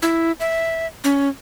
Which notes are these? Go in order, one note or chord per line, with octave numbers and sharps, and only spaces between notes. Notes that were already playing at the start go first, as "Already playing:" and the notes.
E4
E5
C#4